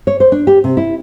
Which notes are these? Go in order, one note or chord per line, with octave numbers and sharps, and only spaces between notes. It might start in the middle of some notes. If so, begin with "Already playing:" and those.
C#5
C5
D4
G4
C3
E4